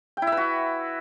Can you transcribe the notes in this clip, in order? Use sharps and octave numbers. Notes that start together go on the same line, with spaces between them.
G5
E4
E5
B4
F#4